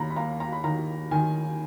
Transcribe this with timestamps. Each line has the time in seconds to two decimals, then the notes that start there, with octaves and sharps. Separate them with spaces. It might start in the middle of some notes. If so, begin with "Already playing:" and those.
Already playing: D#2 A#5 B5
0.10 B5
0.16 A#3 A#5
0.40 A#5
0.52 B5
0.64 D#3 A#5
1.11 D#3 G#5